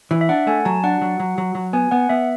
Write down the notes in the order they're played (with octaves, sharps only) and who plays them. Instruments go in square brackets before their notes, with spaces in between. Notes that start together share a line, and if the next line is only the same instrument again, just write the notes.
[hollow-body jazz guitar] E3
[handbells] E5
[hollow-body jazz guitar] D4 [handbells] F#5
[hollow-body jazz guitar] A3 [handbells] G#5
[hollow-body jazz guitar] F#3 [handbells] A5
[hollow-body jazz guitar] D4 [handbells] F#5
[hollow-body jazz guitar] F#3
F#3
F#3
F#3
[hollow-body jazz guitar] B3 [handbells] G#5
[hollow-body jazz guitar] B3 [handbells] F#5
[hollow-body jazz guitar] B3 [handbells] E5